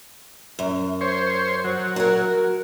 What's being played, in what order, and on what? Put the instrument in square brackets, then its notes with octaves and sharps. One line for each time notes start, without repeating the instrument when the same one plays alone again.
[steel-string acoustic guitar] F#2
[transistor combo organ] C5 C#5
F#3
[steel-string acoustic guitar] F#4 A#4